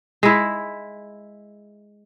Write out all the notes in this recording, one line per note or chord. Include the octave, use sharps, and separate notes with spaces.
G#3 E4